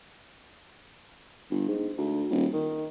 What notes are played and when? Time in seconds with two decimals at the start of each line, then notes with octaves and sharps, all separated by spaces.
1.51 G1
1.68 G#2
1.98 D2
2.30 D#1
2.53 D#3